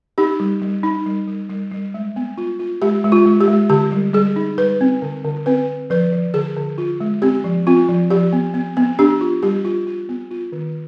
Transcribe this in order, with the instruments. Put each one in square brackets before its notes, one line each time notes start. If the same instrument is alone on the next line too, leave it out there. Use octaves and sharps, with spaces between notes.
[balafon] D#4 G4
G3
G3
D#4
G3
G3
G3
G3
G#3
B3
F4
F4
G#3 G4
G#3
F4
G#3
G4
G#3
D3 G4
G3
G3 G#4
D#4
G3 B4
C4
D3
D3
C4 B4
C4
F3 B4
F3
D3 G#4
D3
F4
G#3
C4 G4
F3
C4 F4
F3
F3 G4
B3
B3
B3
D4 G4
F4
G3 G4
F4
F4
B3
F4
D#3